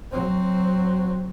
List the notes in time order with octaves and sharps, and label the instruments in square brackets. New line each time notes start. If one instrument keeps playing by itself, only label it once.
[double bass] F#3 C4